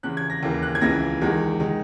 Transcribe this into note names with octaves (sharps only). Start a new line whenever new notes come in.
E2 C#3 E3 F#6
G#6
A#6
D#2 C#3 E3 A#3
F#6
G#6
C#2 C#3 E3 A#6
E2 D#3 G#3
D#3 G#3